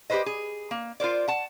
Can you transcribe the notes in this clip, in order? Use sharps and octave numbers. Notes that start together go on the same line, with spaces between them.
G4 G#4 B4 C5 D#5
G#4
A#3
F4 A#4 C5 D5
F#5 A5